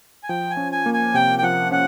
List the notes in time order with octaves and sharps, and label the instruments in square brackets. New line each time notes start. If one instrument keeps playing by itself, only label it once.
[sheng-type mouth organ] G#5
[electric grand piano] F3 [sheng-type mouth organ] G5
[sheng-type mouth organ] G#5
[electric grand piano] C#4
[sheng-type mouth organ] G#5
[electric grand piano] A#3
[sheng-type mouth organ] G#5
[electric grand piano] C3 [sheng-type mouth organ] G5
[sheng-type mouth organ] G5
[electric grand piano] F3 [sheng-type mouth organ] F#5
[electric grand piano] C#4 [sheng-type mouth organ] F#5